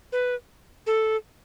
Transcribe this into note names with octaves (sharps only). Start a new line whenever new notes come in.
B4
A4